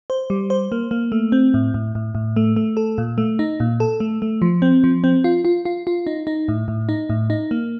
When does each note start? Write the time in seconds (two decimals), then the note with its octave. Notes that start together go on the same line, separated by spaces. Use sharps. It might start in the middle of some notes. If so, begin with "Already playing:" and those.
0.10 C5
0.30 G3
0.50 C5
0.72 A#3
0.91 A#3
1.12 A3
1.32 C4
1.54 A2
1.74 A2
1.95 A2
2.15 A2
2.36 A3
2.56 A3
2.77 A4
2.98 A#2
3.18 A3
3.39 D#4
3.60 A#2
3.80 A4
4.00 A3
4.22 A3
4.42 F3
4.62 C4
4.84 F3
5.04 C4
5.24 F4
5.45 F4
5.65 F4
5.87 F4
6.07 D#4
6.27 D#4
6.48 A2
6.68 A2
6.89 D#4
7.10 A2
7.30 D#4
7.51 A#3